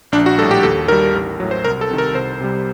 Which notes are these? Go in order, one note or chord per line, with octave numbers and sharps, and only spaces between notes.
A#1 D4
F#4
A2 G3 A4
G4
D#2 A4
D#3 G3 A#4
A1
A2 F#3
C5
C2 A#4
A4
C3 D#3
A#4
C2 C5
C3 G3